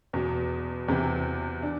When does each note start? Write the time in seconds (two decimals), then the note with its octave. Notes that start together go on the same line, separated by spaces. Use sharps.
0.13 E2 B2
0.88 E2 C3 E3
1.63 D4